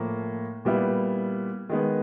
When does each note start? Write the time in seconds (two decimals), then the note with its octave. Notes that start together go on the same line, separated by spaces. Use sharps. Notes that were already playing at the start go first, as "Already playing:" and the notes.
Already playing: A2 F3 A#3
0.65 A#2 G3 B3 E4
1.69 D#3 G#3 B3